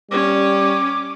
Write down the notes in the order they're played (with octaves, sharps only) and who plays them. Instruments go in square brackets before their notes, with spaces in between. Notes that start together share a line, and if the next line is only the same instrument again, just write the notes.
[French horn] G3 [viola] C#4 [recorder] D6